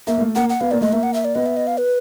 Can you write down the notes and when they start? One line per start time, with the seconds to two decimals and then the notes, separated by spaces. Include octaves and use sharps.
0.07 A#3 E5
0.17 A#3
0.21 A3
0.35 A#3 F#5
0.49 F#5
0.61 B3 F5
0.71 A#3 D5
0.81 A3 D#5
0.92 A#3 E5
1.03 F#5
1.14 E5
1.25 D5
1.35 B3 D#5
1.46 E5
1.57 D#5
1.67 F5
1.78 B4